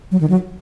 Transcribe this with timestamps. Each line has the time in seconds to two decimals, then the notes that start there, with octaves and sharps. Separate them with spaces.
0.12 F#3
0.21 D#3
0.30 F#3